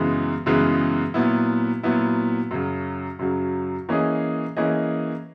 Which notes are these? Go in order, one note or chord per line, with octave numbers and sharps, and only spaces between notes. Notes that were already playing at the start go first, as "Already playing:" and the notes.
Already playing: F#2 C#3 E3 G#3 B3
F#2 C#3 E3 G#3 B3
A#2 F#3 B3 E4
A#2 F#3 B3 E4
F#2 C#3 F#3
F#2 C#3 F#3
E3 A#3 C#4 G#4 D#5
E3 A#3 C#4 G#4 D#5